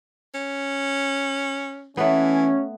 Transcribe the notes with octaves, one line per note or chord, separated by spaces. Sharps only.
C#4
E3 A3 B3 C#4